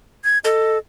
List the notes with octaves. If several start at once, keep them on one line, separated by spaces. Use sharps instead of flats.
G#6
A4 D#5